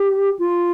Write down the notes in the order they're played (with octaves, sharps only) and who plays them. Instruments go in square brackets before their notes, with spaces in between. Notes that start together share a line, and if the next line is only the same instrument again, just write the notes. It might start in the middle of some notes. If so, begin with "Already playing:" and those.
Already playing: [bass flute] G4
F4